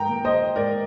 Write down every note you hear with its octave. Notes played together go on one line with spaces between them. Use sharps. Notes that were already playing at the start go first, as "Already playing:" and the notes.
Already playing: G#2 G5 A#5
A#3
C5 D#5
G#2 A#4 D5